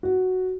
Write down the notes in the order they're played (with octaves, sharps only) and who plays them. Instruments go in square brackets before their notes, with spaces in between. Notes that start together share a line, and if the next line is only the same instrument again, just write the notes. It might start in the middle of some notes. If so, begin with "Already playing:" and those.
[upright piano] F#4